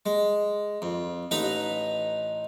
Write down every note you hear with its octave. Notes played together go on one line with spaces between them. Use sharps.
G#3
F2
A1 D#4 B4 A#5 B5